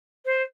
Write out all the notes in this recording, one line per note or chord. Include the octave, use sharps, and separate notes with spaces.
C5